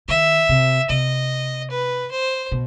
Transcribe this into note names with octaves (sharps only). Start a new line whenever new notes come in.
D#3 E5
C3
C3 D#5
B4
C5
B2